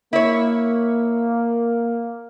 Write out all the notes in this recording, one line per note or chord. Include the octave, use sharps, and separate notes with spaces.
A#3 E4 C#5